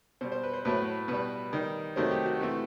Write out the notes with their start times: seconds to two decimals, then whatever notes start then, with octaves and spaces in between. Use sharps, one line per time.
0.21 B2 G3 C5
0.32 C5
0.43 B4
0.53 C5
0.65 A2 F#3 A3 B4
1.08 B2 G3 B4
1.53 D#3 G3
1.96 C3 D#3 F#3 A3 C5
2.11 G4
2.26 F#4
2.40 C3 E3 A3 F#4